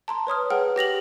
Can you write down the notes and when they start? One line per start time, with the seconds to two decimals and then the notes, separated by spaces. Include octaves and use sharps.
0.08 A5 A#5 C6
0.27 B4 C#5 D#6 F6
0.50 G#4 B4 F#5 G5 F6
0.76 G4 A#6 F7 F#7